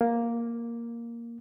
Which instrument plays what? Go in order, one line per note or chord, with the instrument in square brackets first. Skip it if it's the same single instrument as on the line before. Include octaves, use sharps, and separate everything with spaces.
[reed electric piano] A#3